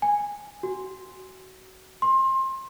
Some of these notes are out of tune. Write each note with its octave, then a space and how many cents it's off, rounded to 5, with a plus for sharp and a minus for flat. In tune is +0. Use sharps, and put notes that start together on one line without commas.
G#5 -10
F#4 +20
C6 +25